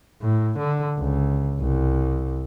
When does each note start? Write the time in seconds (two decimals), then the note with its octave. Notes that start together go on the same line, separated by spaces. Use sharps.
0.21 A2
0.58 D3
0.97 C#2
1.60 C2